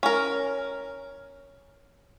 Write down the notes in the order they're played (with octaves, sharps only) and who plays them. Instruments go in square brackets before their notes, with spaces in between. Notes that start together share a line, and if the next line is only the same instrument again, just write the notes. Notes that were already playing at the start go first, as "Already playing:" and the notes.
[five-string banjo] C#4 A#4